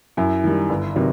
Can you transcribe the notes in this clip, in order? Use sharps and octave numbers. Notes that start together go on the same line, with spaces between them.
F#2 E4
D#3 G3
G1
C3 D#3 F#3